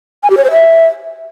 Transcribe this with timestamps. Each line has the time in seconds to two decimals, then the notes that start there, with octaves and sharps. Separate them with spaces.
0.23 G#5
0.30 G4
0.37 C#5
0.44 C5
0.51 E5